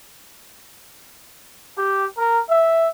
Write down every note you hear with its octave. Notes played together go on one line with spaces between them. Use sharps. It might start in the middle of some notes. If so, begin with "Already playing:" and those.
G4
A#4
E5